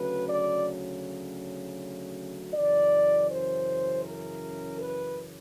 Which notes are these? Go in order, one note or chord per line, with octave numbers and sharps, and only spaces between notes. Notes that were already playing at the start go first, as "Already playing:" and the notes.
Already playing: D2 C#3 F#3 B4
D5
F#2 C#3 E3 D5
C5
A#4
B4